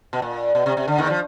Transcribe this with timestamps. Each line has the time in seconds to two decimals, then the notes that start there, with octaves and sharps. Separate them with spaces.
0.13 B2
0.22 A#2
0.55 B2
0.66 C3
0.77 C3
0.88 D3
0.98 D#2 D#3
1.10 F3